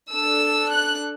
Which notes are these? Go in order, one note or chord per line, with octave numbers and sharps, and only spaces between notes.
D4 A4 E6
F#6